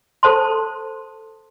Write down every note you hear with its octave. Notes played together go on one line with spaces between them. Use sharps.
A4 C5 A5 C6